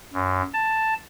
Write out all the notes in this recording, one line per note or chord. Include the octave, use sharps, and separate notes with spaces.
F#2
A5